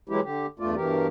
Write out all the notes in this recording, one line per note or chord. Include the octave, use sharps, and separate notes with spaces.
E3 F#3 G#3 E4 G4
D3 G4
E2 G2 A3 F4 D5
G2 B2 E3 G4 A#4